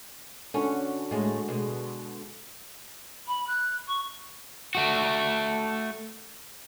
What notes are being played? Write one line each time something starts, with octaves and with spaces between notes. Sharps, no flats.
D3 C#4 F#4
A2 G#3
B2 G#3
B5
F#6
C#6
A3 F#4